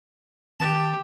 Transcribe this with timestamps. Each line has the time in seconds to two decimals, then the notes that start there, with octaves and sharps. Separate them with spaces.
0.60 D#3 G4 A5